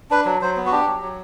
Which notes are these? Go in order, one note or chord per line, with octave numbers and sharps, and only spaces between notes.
D4 B4
F#3
F#3 C5
B3
F#4
D4 G4
F#3
F#3